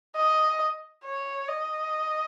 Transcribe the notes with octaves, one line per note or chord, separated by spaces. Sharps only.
D#5
C#5
D#5